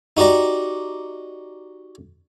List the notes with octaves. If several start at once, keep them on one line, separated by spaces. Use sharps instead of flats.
D#4 F#4 G4 D5 A#5